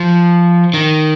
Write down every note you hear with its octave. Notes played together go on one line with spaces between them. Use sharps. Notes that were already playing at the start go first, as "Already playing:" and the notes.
Already playing: F3
D#3